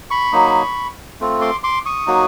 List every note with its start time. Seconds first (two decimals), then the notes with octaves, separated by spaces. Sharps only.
0.10 B5 C#6
0.32 F#3 A#3 D#4
1.20 A3 C4 F4
1.41 C6 D6
1.63 C6 D6
1.86 C#6 D#6
2.07 F#3 A#3 D#4 F#4